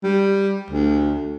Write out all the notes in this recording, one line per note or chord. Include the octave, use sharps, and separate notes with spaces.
G3
D2